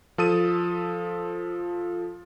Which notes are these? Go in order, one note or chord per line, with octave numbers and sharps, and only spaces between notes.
F3 A4 D#6 D#7